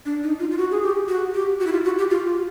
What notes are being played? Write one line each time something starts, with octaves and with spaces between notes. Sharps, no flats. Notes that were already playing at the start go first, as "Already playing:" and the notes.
D4
D#4
F4
F4
F#4
G#4
G4
F#4
G4
F#4
E4
F4
F#4
G4
F4